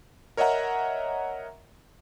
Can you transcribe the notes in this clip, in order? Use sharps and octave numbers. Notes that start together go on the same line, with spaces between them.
A#4 C#5 D#5 E5 F#5 A#5